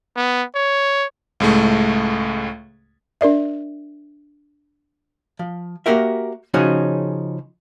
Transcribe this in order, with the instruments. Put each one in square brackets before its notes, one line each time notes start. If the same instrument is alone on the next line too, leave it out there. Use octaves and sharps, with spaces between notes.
[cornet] B3
C#5
[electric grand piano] C#2 A2 G#3 A3
[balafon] D4 A#4 D5 E5
[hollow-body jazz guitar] F3
A#3 F#4 G4 A#4 E5
C#3 F3 C#4 D#4 F#4 G#4